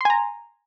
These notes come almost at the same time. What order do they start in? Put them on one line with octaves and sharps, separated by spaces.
C6 G#5 A#5